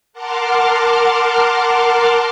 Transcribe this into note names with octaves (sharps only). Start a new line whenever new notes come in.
A#4 F#5 A5 C6 D6 F6